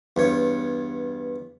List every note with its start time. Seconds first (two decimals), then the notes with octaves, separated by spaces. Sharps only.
0.16 E2 G2 C#5